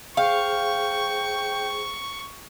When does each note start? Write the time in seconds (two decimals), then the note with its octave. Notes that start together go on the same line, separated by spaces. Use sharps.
0.17 G#4 C5 F5 G5 C#6